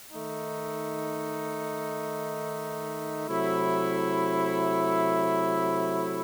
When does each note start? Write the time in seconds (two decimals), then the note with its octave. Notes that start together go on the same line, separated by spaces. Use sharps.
0.12 D#3 A3 D#4
3.29 C3 F#3 A3 E4